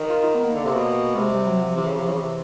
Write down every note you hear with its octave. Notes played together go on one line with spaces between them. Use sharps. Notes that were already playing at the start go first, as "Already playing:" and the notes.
Already playing: D#3
F4
D#4
B3
A#3
D3
C3
B2
C3 G#3
G3
F#3
F3
C3 E3
C#3
C3 F3
C#3 E3
C3